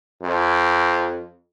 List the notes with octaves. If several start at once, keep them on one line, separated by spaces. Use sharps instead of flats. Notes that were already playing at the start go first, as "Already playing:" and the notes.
F2